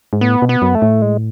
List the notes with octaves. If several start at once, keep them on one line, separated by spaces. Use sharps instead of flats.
G#2
A2 B3
B2
B3
F#2
A3
A2
G#3